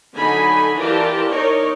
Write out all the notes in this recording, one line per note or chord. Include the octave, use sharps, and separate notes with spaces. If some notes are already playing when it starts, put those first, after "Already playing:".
D3 F#3 D#4 G#5 B5
E3 F4 G4 A#4 D5 A5
D#4 A#4 C#5 D5